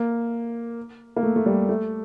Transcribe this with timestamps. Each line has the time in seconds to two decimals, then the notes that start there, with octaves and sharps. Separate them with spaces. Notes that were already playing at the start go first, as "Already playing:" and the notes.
Already playing: A#3
1.16 A#3
1.23 A3
1.36 A3
1.46 G3
1.69 A3